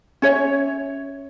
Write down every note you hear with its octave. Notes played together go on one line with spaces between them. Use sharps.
C#4 C#5 E5